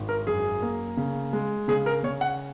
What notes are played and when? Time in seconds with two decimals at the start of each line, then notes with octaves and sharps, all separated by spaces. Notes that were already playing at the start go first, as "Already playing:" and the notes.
Already playing: G#1
0.09 A#4
0.27 F#2 G#4
0.62 A#3
0.97 C#3
1.33 G#3
1.68 C#3 G#4
1.86 A#4
2.03 C#3 C#5
2.21 F#5